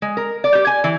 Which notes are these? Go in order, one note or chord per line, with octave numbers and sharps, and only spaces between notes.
G#3
A#4
D5
G4
G#5
E3